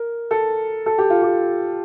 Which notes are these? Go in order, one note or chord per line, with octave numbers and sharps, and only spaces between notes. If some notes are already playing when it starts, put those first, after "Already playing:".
Already playing: A#4
A4
A4
G4
F4
G4